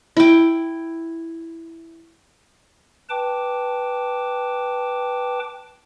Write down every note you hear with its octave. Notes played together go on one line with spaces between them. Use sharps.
E4 G5
B4 G5 A5 D6